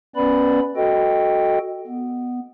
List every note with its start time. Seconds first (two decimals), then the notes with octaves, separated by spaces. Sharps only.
0.15 B3 C#4 B4 D5 B5
0.76 F#4 A4 D#5 G5
1.87 B3